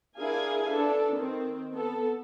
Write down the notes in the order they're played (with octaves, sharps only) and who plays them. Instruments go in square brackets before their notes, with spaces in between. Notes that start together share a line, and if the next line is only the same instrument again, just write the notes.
[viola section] D4 E4 G#4 A#4 F5 G#5
D4 A4 B4
D#3 C4
B3 A4